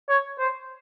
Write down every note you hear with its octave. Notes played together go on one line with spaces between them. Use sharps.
C#5
C5